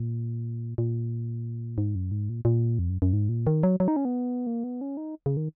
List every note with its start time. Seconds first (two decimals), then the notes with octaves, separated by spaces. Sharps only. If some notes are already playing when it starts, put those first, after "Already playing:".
Already playing: A#2
0.78 A#2
1.78 G#2
1.95 F#2
2.11 G#2
2.29 A#2
2.45 A#2
2.79 F2
2.90 F#2
3.02 F#2
3.13 G#2
3.29 A#2
3.47 D#3
3.63 F#3
3.80 F#3
3.88 D#4
3.96 C#4
4.05 B3
4.47 A#3
4.64 B3
4.81 C#4
4.97 D#4
5.26 C#3
5.37 D#3